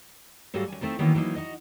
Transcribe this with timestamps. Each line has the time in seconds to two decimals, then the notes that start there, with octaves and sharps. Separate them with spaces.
0.54 G#2 F#3 G3 F#4 A4 F5
0.68 F#2 G#5
0.81 A3 C4 D#4 F4
0.99 D#3 E3 F#3 A#3 B3 C#4
1.14 E3 F#3 G3 A#3 D#4
1.35 D#4 F#4 D#5